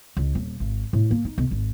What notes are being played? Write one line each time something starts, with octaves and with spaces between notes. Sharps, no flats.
C#2
D#1
G#1
A2
A#3
D#4
B1
G#1